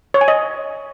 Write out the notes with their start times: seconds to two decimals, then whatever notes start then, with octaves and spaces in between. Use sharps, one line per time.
0.14 C#5
0.21 G#5
0.28 D#5